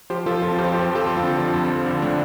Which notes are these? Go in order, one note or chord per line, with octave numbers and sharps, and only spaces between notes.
F3 G4 C5
F3 F4 A4
F2 F4 A4
F2 G4 C5
F3 G4 C5
F3
F4 A4
F2
C4 F4
D3
F3
F2
F2
D3
D3 A3 D4